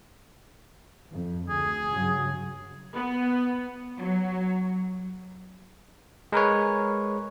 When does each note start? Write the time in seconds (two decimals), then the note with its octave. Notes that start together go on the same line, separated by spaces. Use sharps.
1.12 F2
1.49 D2 G#4
1.91 G2 C#3 F#3
2.94 B3
3.99 F#3
6.32 G#3 A#4 B4 C#5